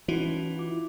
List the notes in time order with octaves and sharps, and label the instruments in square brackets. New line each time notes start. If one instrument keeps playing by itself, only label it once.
[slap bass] E3 [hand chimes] C#4 D#4 F#4
[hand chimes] F4 D6